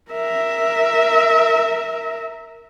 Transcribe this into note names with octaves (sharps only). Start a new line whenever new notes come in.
A#4 E5